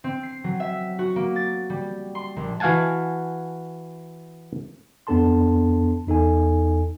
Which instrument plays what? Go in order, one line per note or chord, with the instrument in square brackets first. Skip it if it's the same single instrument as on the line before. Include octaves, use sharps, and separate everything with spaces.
[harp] C4
C7
F#3
E5
F#4
A#3
A6
G3
C6
A#1
[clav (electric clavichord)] E3 F#4 F5 F#5 G#5 A5
[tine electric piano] F2 B3 D4 A4 A5 C6
E2 D#4 A4 G#5